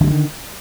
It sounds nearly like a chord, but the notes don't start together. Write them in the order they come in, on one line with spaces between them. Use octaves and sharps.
D3 F#3 G3 D#3